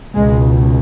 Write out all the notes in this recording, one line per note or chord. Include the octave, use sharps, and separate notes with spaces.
C#2 B2 G#3